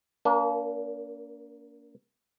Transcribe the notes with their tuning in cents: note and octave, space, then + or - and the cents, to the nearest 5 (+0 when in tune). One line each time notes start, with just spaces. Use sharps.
A#3 +0 D4 -40 A#4 +35